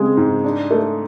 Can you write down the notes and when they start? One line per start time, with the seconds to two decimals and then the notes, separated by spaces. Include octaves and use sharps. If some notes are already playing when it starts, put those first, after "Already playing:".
Already playing: C#3 G#3 C4
0.17 G#2
0.44 D4
0.71 A3